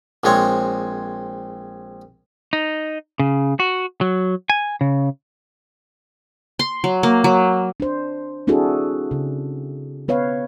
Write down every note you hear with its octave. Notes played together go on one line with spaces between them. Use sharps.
A#1 G#3 C4 C#5
D#4
C#3
F#4
F#3
G#5
C#3
C6
F#3
A#3
F#3
D4 C5
C4 D4 E4 F#4 G#4 A4
C#3
B3 B4 C#5 F5